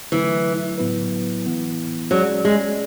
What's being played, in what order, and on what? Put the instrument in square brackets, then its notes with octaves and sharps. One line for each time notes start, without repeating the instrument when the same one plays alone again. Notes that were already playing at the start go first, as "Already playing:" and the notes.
[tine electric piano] D3 F#3 A3 E4 [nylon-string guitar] E3
[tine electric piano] A2 F#3 B3 E4 B4
E3 B3 E4
[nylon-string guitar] F#3 [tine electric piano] G#3 C#4 G#4 D5
[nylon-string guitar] G#3